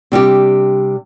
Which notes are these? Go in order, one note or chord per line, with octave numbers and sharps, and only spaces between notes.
C3 G3 D4 G4